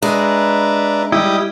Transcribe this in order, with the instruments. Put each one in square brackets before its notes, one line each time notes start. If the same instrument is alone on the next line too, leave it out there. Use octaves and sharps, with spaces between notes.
[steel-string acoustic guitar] G#3 [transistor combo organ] D4 [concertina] B4 E5 A#5
[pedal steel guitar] G3 E4 [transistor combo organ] G4 D#5